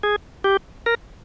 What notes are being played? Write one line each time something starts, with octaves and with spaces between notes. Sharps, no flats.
G#4
G4
A#4